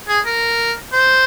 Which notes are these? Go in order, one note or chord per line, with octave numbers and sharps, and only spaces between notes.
G#4
A#4
C5